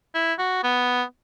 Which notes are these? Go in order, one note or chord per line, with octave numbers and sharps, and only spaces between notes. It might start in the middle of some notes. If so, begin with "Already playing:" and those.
E4
F#4
B3